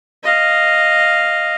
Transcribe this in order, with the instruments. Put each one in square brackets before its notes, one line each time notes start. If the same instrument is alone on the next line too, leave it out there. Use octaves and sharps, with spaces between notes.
[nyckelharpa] D#5 F5